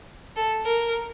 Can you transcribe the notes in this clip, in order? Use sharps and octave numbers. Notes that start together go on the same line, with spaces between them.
A4
A#4